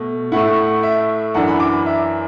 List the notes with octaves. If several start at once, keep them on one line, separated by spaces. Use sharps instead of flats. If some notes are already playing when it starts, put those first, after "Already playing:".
Already playing: B2 A3
A2 A3 E4 F#5
E5
F#2 E3 D4 F#5
B5
D6
B5
E5